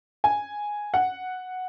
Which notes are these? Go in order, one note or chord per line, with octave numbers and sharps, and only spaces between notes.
G#5
F#5